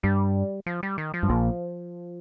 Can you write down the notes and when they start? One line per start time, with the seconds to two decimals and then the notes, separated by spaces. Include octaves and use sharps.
0.03 G2 G3
0.66 F3
0.83 G3
0.98 D#3
1.14 F3
1.23 G2
1.29 A#1 A#2